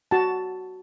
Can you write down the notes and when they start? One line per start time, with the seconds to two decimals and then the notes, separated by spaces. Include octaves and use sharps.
0.11 F#4 A5